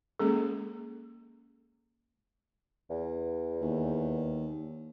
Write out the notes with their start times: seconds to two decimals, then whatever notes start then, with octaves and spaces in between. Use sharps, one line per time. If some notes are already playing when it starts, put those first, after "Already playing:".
0.19 G#3 A#3 C#4 G#4 A4
2.90 E2
3.61 D#2